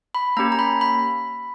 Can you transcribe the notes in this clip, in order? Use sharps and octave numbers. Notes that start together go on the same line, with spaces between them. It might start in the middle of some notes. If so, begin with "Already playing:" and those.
B5
A#3 C#4 G4 A#5
A#5
B5
B5